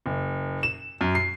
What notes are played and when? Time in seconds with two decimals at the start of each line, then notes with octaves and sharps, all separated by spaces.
0.06 F#1
0.63 E7
1.01 F#2
1.15 C7